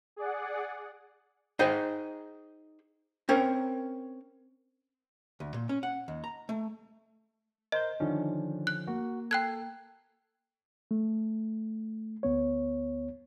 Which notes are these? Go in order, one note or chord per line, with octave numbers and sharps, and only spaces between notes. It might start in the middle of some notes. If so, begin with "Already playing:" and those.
G#4 D5 F#5
D#4 G#4 C5 D#5 G5
C4 C#4 A#4
D2
A#2
C#4
F#5
D#2
A#5
A3
A#4 C5 D#5 G6
D3 D#3 F3 C#4 D4
F#6
A#3 F#4
A4 G5 F#6 G#6
A3
D2 B3 C#5